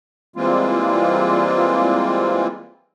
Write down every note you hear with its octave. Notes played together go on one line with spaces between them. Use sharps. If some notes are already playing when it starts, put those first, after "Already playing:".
E3 G3 G#3 A#3 C4 F4